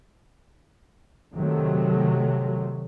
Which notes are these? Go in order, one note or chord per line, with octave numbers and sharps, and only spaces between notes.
C3 D#3 F#3 A3